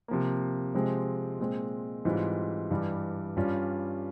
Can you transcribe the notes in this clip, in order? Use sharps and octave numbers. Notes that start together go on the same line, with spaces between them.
C3 F3 A#3
C3 F3 G#3 C4
A#2 G#3 C4
G#2 E3 G3 C4 F4
G2 E3 G3
G2 G3 C#4 F4